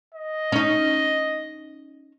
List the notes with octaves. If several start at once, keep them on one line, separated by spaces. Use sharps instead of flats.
D#5
C#4 D#4